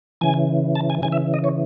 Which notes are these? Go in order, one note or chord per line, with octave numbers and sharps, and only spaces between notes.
C#3 E3 G#5
A5
G#5
C#3 E3 G#5
E5
D#5
C#5